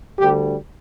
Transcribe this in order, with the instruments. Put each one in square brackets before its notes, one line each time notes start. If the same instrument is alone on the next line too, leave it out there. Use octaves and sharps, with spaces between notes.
[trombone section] D2 D3 G3 G4